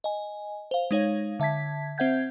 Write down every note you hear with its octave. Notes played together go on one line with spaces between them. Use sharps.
D#5 G#5
C5 F5
G#3 D#4 C#5 F5
D3 E5 A5 G#6 B6
C4 C5 E5 F#5 G6 G#6